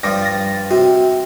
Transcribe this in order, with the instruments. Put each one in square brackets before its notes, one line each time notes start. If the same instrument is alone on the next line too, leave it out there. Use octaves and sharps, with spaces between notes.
[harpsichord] G2 F3 [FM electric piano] G5 D6 A#6
[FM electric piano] A6 A#6
[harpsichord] C3 [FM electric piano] F#4